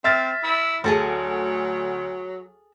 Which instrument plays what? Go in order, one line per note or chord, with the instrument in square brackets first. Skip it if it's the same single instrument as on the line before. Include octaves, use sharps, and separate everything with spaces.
[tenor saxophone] C4 [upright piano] E5 F6 A6
[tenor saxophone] E4
[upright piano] D2 [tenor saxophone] F#3 [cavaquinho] G#4 A4 A#5